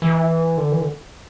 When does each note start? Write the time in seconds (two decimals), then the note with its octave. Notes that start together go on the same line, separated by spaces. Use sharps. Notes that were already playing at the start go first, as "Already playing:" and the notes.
0.02 E3
0.57 D3
0.72 E3
0.81 D3